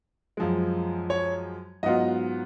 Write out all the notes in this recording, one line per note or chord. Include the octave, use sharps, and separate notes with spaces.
F#2 F3 G#3
C#5
G#2 F#3 B3 F4 D#5